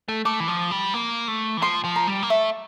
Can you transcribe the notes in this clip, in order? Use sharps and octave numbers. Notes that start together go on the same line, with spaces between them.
A3
A3 D6
E3
F3
G3
A#3
A3
E3
F3 C6
F3
A#5
G3
A#3
A3 E5